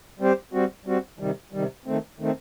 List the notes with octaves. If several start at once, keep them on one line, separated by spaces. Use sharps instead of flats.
G3 C4 G4 C5
G3 C4 F#4
G3 C4 F#4
C3 D#3 G3
C3 D#3 G3
D#3 A3 C4
D#3 A3 C4